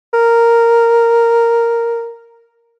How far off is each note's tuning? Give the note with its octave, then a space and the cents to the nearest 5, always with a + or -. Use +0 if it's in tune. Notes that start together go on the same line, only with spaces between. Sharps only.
A#4 -5